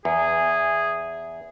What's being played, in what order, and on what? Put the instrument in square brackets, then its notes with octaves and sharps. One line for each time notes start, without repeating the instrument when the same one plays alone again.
[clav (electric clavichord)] E2 [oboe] G#4